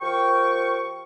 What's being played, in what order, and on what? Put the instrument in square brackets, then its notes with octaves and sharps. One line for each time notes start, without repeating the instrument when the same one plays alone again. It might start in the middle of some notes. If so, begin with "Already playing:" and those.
[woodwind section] F3 G4 A#4 G5 C#6